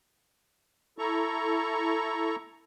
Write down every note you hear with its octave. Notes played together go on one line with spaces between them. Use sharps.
E4 A4 A#5 C#6